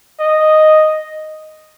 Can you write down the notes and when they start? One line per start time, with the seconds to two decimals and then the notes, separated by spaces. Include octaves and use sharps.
0.19 D#5